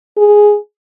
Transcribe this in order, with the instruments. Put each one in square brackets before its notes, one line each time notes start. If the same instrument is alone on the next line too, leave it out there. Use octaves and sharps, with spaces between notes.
[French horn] G#4